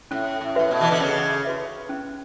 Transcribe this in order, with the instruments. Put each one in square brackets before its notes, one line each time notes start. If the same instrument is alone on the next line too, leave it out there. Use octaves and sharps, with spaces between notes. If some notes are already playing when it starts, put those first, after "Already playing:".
[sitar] A2 [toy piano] C#4
[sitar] A2
[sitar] A2 [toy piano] F#4 B4 E5
[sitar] B2
E3
D3
[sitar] C#3 [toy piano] C#4
[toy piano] F#4 B4 E5
C#4